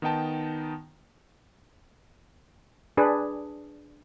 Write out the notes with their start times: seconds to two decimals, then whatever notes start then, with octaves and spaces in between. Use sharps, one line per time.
0.02 D#3 B3 D#4 G5 A5
2.97 D4 G#4 B4